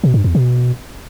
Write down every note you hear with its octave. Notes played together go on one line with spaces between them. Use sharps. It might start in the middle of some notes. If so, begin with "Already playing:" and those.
B2
G2
E2
B2